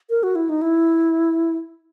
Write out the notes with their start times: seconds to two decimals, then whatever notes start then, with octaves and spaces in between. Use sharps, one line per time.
0.10 A#4
0.23 F#4
0.35 E4
0.49 D#4
0.62 E4